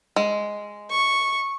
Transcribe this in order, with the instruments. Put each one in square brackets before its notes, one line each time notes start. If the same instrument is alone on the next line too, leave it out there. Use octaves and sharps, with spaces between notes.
[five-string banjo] G#3
[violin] C#6